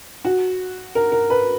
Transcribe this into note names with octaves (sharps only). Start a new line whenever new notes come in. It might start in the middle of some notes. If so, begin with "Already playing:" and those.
F#4
A#4
A#4
B4